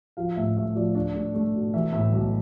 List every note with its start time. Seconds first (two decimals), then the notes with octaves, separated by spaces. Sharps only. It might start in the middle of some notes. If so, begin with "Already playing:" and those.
0.17 F3 F5
0.36 A2 E5
0.57 A3 E5
0.75 F3 D5
0.95 D4
1.14 A3
1.34 A3
1.55 B2
1.74 E3 E5
1.93 A2 E5
2.13 B1